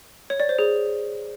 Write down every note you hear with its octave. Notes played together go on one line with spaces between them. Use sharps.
C#5
D5
C5
G#4